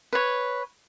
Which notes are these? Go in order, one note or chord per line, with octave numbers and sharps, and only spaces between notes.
B4 C#5